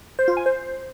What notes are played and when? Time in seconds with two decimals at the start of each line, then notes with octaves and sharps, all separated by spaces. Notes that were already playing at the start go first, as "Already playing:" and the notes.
0.19 C5
0.28 F4
0.37 G#5
0.46 C5